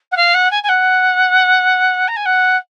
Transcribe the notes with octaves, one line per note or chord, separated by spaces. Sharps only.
F#5
F5
F#5
G#5
G#5
F#5
A#5
G#5
F#5